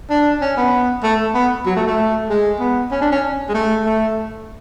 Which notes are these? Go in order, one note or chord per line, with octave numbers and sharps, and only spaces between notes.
D4
C#4
B3
A3
B3
F#3
A3
A3
G#3
B3
C#4
D4
C#4
G#3
A3
A3